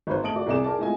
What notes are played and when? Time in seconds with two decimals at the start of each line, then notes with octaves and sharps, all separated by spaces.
0.07 G#1 B4 C5
0.22 A3 D#5 A5 D#6 D7 F#7
0.34 F#4 D5
0.46 C2 C3 G#4 D5 D#6 E7
0.64 G#4 A#4 D5 A5
0.79 A2 G#3 F4 D#5 E5 G#5